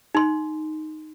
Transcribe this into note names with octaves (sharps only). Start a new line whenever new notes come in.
D#4 C6